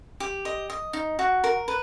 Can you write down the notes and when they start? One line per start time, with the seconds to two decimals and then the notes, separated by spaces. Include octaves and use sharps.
0.20 G4
0.45 D#5
0.70 D#5
0.93 D#4
1.19 F#4
1.44 A#4
1.68 B4